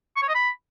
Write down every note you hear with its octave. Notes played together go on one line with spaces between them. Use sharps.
C#6
C#5
D#5
B5